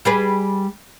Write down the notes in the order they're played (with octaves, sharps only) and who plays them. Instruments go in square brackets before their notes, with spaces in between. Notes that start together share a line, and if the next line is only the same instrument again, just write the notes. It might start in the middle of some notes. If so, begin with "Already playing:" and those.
[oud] G3 G#4 B4